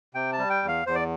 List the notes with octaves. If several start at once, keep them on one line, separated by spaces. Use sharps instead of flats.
C3 G5
A5
G3
G5
E2
F5
E2 C5
D5